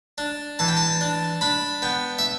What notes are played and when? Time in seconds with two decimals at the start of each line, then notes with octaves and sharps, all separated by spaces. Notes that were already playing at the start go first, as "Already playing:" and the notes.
0.18 D4
0.59 E3 A5
0.68 G5
0.77 A5
1.01 D4
1.41 D4 B5
1.82 B3 G5
2.19 E5